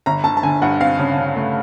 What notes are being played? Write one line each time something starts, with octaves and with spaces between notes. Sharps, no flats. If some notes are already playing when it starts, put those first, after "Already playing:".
G1 A#5
D3 A5
A5
D3 G#5
G2 F#5
C4 F5
C#3
C#3
A3